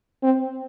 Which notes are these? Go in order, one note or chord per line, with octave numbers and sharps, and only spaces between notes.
C4